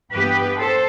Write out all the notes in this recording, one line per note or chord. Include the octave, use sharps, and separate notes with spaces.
G2 E3 B3 G4 B4
A4 C5